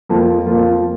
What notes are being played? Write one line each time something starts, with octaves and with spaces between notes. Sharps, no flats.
F2 F3 A#3 F4
F2 F3 A#3 F4